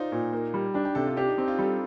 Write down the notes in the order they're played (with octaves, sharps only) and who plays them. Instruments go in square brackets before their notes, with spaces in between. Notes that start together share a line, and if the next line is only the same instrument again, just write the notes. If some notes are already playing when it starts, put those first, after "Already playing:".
Already playing: [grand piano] D#4 C5 D5 [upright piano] F4
[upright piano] A#2
A#3
G3
[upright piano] D4 [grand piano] G4
[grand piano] G4
[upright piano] C3 [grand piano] A4
[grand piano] F4
[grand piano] D4 [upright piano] G4
[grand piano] D#4
[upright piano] C4 [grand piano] D#4
[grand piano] F4
[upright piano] G3 [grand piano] A4